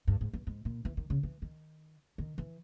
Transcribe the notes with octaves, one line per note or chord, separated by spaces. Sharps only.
G2
G#2
G2
G#2
A#2
E3
D#3
C#3
E3
D#3
D#3
E3